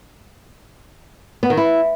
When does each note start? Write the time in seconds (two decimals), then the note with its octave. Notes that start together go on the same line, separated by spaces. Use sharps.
1.43 B3
1.50 D#3
1.57 E4